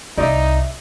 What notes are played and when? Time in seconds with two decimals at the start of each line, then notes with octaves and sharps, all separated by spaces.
0.17 C2 D#4 D5 E5